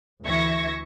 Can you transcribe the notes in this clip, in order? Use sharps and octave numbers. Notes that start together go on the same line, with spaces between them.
D2 E3 E5 C#6 G#6 A#6